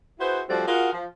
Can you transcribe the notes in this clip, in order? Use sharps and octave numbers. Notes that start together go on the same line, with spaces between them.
E4 F#4 G#4 B4 C5
F3 G3 A3 C4 F#4 D5
F4 F#4 G#4 A#4 F#5
F3